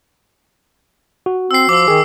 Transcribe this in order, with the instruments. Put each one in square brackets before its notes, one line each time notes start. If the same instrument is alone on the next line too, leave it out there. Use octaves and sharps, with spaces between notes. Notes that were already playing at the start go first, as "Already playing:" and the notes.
[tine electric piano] F#4
[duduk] C4 [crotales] E6 C7
[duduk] F3 [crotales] D6 E6
[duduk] D#3 [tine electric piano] G#4